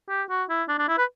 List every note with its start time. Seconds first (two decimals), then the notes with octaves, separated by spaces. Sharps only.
0.09 G4
0.30 F#4
0.49 E4
0.68 D4
0.79 D4
0.88 E4
0.97 B4